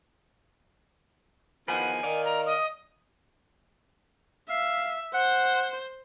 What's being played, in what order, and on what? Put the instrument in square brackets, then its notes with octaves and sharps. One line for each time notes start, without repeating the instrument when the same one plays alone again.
[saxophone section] E2 D#3 F3 [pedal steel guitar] B4 F#5 [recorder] G#5
[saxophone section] D#3 [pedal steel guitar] D5 F5
[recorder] A#5
[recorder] D#5 [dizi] D#6
[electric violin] E5 [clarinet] F5
[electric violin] C5 [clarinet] F#5